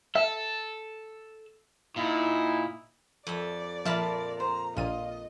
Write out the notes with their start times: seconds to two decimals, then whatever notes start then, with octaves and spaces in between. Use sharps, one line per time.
0.15 A4 E5
1.96 A#2 D#4 E4
3.27 F2 D5 E5
3.85 A#2 F3 A#4 E5 A5 B5 F6 B6
4.40 C5 A#5
4.77 A#1 A#2 F4 D#5 D#7